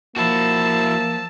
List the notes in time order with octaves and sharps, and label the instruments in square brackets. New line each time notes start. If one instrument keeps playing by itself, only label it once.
[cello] F3 [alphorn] A#3 [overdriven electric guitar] E4 F#4 [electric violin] A5 E6